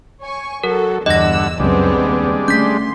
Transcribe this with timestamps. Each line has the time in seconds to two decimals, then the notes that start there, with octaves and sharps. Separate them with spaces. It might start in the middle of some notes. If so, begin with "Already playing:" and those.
0.21 C#5 G#5 C#6
0.64 F#3 A4 A#4
1.06 E2 G2 D3 D#5 F#5 E6 A#6
1.60 C#2 F#2 C#3 G3 G#3 B3 C4 D4
1.98 D#2
2.48 D3 A3 C#4 C6 G6 B6